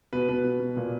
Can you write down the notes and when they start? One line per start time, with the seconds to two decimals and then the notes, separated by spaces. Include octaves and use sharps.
0.13 B2 B4
0.29 B2 B4
0.44 B2
0.60 B2
0.77 A#2